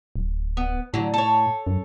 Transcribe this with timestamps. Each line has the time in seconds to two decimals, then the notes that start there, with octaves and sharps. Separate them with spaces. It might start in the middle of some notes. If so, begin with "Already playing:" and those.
0.16 D1
0.57 B3
0.94 A2 D3 F#3
1.14 A4 C#5
1.67 F#2